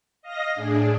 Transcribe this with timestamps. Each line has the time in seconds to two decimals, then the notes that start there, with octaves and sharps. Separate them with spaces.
0.22 D#5 F5 A#6
0.55 A2 D4 G#4